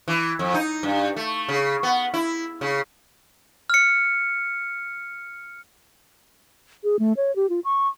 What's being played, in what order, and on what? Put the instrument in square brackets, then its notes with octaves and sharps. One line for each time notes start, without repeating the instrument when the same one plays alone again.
[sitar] E3
F2
D#4
G2
A3
C#3
B3
E4
C#3
[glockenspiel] F6 C#7
[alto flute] G#4
A3
C#5
G4
F4
C#6